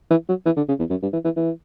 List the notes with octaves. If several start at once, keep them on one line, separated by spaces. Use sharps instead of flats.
E3
F#3
E3
D3
C#3
E2
F#2
G2
E3
E3
E3